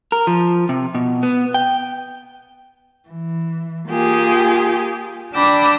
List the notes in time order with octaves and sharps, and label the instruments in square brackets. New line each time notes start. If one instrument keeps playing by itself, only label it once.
[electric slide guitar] A#4
F3
C3
B2
B3
G5
[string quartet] E3
A#3 F4 G4 G#4
D4 G5 B5 D6 E6 A#6